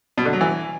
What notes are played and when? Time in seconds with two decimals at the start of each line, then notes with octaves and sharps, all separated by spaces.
0.18 B2
0.25 D3
0.33 F#3
0.41 E3